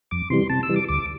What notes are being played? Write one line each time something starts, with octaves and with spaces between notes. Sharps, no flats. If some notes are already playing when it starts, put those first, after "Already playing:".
F2 D6
C3 E3 G3 C6
C3 A5
E6
E3 G3
D6
D2 D6